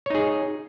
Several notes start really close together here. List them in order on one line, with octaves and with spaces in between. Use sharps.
C#5 D#4 G#4